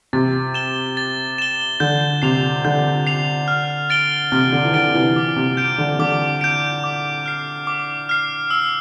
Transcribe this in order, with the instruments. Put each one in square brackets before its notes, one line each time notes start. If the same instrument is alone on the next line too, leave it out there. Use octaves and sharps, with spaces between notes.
[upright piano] C3 [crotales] A6
[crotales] E7 G7
A6
E7 G7
[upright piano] D3 [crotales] G6
[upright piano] C3 [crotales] C7 F7
[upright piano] D3 [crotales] G6
[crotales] C7 F7
F6
A6 D7 G7
[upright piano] C3 [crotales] F6
[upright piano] D3
E3
[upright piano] D3 [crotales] A6 D7 G7
[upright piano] C3 E3
[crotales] D6
[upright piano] C3
[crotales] G6 D7
[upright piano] D3
[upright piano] D3 [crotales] D6
[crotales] G6 D7
D6
F6 C7
D6
F6 C7
E6